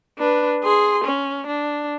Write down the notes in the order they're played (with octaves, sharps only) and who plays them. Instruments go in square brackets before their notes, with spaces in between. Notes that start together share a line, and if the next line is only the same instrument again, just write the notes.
[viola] D4 B4
G#4 C6
C#4
D4